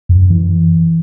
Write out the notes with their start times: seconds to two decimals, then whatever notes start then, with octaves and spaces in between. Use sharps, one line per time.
0.09 F#2
0.30 E3